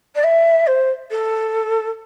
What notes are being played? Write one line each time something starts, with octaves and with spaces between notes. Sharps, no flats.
D5
E5
C5
A4